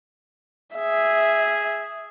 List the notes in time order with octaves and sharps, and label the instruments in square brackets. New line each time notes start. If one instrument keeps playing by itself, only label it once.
[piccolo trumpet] G#4 [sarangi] E5